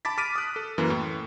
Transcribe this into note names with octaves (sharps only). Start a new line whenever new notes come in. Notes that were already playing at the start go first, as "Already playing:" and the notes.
A5 B5 D6 A6 B6
D6 F6 B6 D7 D#7
D#6 F#6
A4
F#2 E3 A#3
A2